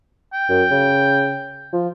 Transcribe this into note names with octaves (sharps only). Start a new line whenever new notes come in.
G5
F#2
C#3
F3